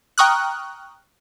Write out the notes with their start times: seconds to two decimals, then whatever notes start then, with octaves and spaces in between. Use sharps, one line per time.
0.18 G5 A#5 C#6 D#6 F6 F#6